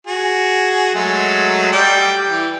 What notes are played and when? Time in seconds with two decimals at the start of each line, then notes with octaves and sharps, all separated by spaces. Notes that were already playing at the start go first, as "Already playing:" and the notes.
0.07 F#4 G#4
0.95 F#3 G#3 A3
1.72 G3 D5 G5
2.30 E3